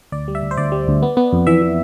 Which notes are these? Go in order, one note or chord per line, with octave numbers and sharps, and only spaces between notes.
D2 D5
G3
E5
D2
C5
D2 D5
G3
D2
B3
B3
F2
E3 E5
E3